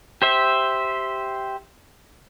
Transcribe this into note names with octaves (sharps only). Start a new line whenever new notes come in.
G4 C5 E5